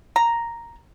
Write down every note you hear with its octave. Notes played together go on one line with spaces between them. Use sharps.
A#5